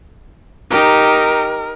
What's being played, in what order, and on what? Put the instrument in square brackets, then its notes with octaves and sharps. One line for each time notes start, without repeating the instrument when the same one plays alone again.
[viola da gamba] D#4 G4 [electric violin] A#4